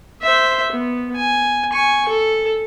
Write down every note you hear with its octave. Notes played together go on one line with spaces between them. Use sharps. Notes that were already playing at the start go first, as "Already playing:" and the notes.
C5 E5
B3
G#5
G#5 C#6
A4